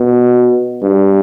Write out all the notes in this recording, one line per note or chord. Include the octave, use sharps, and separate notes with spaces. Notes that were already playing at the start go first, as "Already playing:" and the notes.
Already playing: B2
G2